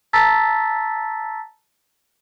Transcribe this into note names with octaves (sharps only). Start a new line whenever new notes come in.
A5 A#5 E6 A6 B6